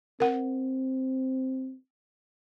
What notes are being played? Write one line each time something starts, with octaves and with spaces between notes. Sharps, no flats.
C4 A#4 F#5